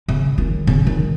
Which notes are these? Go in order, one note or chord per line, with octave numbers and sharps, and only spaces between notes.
C#3
D#3
C#3
D#3